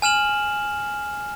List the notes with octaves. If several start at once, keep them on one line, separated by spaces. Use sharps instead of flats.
G#5 F6 E7 F#7